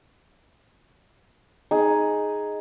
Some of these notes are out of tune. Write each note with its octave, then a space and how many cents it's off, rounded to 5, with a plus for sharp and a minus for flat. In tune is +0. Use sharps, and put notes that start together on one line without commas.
D#4 +0 G#4 +5